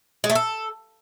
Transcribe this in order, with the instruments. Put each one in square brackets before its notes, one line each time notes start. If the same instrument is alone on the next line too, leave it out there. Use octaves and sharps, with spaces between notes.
[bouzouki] G#3
A3
A4